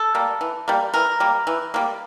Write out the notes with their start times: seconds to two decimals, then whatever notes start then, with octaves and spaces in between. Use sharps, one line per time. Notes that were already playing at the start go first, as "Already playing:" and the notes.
Already playing: A4
0.15 G3 A#3
0.41 E3
0.68 G3 A#3
0.94 E3 A#4
1.20 G3 A#3
1.47 E3
1.74 G3 A#3